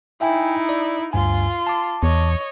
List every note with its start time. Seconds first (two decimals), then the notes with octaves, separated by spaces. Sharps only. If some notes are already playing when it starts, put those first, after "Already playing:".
0.21 D#4 E4 E5 G5 G#5
0.69 D5
1.13 D2 G2 F4 G#5 C6
1.67 A5 D6
2.03 E2 C#5 D#5